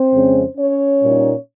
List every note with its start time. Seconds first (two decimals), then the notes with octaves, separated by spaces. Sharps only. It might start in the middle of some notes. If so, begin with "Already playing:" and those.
Already playing: C4 C5
0.13 F2 C#3 G#3 C#4
0.57 C#4 C#5
1.02 A#2 G3 A#3 D#4